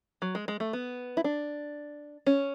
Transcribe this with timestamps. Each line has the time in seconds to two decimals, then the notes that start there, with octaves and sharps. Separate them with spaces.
0.22 F#3
0.35 G#3
0.48 G#3
0.60 A3
0.73 B3
1.17 E4
1.24 D4
2.27 C#4